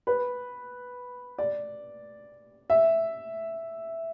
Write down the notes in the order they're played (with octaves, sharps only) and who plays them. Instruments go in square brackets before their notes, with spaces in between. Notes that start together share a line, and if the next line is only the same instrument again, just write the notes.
[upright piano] B4
D5
E5